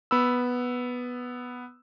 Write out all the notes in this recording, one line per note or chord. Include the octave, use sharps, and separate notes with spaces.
B3 B5 E6